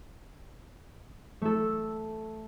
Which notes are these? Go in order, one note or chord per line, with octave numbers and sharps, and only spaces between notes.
A3 A4